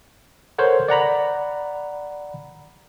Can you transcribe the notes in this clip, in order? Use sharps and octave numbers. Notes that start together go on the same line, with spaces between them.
A4 A#4 C5 C#5 F#5
D5 F#5 A#5 B5